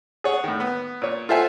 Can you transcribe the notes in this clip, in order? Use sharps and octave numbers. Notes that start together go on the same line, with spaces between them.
G#4 C#5 F#5
A2 D#3
B3
A#2 C#5
F4 A4 C5 E5 F#5 G#5